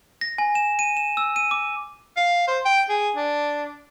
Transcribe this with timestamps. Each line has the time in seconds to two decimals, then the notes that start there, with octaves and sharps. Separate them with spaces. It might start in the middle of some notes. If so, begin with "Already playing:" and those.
0.21 A#6
0.38 G#5
0.55 E7
0.79 D#7
0.97 E7
1.17 E6
1.36 D#7
1.51 D6
2.17 F5
2.48 C5
2.65 G5
2.89 G#4
3.16 D4